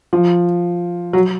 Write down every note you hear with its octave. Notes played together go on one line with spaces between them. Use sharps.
F3
F#3